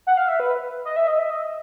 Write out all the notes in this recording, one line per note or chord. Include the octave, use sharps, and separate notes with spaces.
F#5
F5
E5
B4
D#5
E5
D#5
E5
D#5